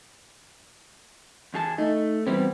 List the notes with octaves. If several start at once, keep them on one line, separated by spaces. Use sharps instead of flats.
E2 G#4 A5
A3 D#4
E3 G3 B3 C4